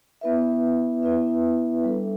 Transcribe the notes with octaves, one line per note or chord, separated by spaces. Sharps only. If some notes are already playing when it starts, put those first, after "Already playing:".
B3 E4 B4 E5
B3 E4 B4 E5
G3 D4 A4